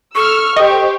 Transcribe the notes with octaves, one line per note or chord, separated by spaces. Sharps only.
A4 C#6 E6 F6
G4 C5 D#5